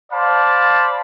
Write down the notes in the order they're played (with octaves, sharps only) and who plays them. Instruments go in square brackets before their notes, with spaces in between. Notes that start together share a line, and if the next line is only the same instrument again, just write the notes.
[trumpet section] C5 D5 F5 A5 B5